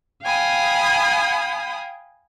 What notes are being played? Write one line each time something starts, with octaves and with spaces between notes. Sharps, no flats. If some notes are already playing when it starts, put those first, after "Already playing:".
F5 G5 G#5 B5 D#6